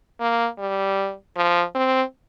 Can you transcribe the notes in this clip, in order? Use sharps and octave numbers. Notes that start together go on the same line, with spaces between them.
A#3
G3
F3
C4